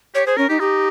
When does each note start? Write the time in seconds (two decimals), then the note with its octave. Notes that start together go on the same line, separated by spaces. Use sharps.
0.15 G4 C#5
0.26 G#4 C5
0.37 C#4 A#4
0.49 D#4 G4
0.60 D#4 G4